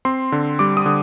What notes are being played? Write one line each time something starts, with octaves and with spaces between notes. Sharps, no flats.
C4 C6
D3
G3 D6
D#6
D3